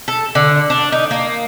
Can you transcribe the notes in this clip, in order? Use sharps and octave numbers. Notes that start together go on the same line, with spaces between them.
A4
D3
D4
D#4
A#3